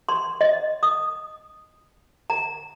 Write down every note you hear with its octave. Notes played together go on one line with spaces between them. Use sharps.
C6
D#5
D#6
A#5